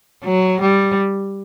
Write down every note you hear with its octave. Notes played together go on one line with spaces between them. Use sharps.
F#3
G3